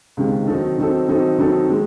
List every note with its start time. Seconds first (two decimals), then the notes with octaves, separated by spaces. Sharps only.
0.17 C#2 C3 D#3 G#3
0.47 D#3 F#3 C4 D#4 A4
0.78 D#3 F#3 C4 D#4 A4
1.08 D#3 F#3 C4 D#4 A4
1.38 D#3 F#3 C4 D#4 A4
1.69 D#3 G#3